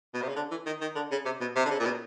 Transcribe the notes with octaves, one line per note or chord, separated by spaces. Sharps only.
B2
C3
C#3
D3
E3
D#3
D#3
D3
C#3
C3
B2
C3
D3
C#3
A#2
B2